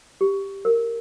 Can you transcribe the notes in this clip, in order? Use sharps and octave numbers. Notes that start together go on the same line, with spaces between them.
G4
A#4